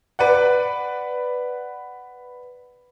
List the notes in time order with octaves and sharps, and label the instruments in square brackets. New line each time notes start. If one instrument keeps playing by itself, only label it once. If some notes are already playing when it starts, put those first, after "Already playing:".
[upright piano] B4 D5 F#5